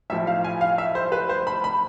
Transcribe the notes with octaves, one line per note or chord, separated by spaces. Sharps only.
B1 A2 F3 E5
F5
G#5
F5
E5
C5
B4
C5
B5
B5